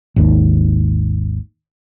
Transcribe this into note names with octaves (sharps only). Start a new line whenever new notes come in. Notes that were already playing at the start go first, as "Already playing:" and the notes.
G#1 D#2